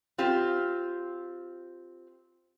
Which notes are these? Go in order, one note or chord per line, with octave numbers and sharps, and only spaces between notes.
C4 F4 G4